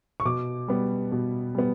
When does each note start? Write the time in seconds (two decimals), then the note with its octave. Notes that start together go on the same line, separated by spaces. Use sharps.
0.20 C#6
0.25 B2 D6
0.68 G3 B3
1.12 B2
1.55 G3 B3